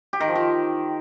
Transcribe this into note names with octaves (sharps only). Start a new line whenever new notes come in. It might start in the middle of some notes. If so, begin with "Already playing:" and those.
G4
D#3
F3
D#3